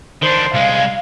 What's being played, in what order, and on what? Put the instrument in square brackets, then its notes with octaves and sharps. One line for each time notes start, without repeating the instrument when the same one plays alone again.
[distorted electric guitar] D#3 D4 [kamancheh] C5
[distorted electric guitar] C2 G#3 [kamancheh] F5